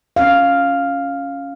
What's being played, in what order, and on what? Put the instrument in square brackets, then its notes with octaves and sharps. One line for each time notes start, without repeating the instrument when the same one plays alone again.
[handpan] C#4 F5